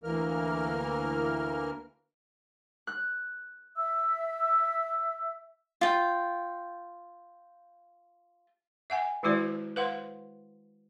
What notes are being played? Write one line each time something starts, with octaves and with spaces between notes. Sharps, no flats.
D2 E3 A#3 A#4 F6
F#6
E5 E6
F4 G5
E5 F#5 G#5
D#3 G#3 E4 F#4 C5 D5
B4 C5 F5 F#5 C6